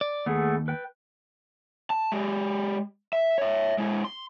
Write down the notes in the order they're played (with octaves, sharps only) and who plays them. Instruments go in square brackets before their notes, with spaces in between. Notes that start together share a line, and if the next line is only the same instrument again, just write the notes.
[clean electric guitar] D5
[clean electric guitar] D#2 [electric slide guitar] A3 B3 G#4
[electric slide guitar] B4 G5
[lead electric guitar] A5
G#3 G4
E5
C#5 E5
G#3 E4
C6